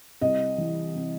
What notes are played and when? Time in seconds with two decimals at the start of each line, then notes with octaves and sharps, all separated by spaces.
0.21 C2 D#5
0.58 E3
0.95 C3